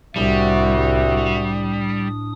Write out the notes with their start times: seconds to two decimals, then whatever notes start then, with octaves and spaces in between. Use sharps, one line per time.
0.16 C2 A2 G3 D4 F#4 E5 D#6